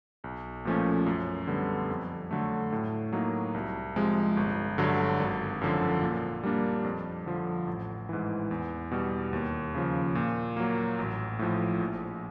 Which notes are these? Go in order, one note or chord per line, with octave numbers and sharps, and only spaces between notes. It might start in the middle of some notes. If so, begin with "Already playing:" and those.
B1
A#2 F3 A3 C#4
F#2
D3 G3 B3
F2
D3 F#3 A3
A2
F#3 A#3 D#4
C2
C3 F3 G#3
G1
G2 D3 F#3
G#1
F#2 D3 F3
A#2
G3 A#3 D4
F2
D3 F3
A1
G#2 E3
E2
B2 G3
D#2
C#3 F3
A#2
F#3 A#3
A1
A2 F3
A#1